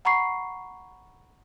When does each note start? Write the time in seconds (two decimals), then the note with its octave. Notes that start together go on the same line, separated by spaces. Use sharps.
0.05 F#5 A#5 B5 C#6 C7